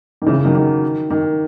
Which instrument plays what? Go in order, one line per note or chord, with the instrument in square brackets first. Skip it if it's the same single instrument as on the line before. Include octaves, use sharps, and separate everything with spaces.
[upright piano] D#3
C#3 E3
D#3 F#3
D#3
D#3